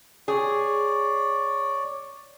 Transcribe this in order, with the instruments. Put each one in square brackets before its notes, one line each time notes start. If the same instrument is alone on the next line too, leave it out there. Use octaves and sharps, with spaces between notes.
[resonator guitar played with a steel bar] G#4 [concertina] C#5 D5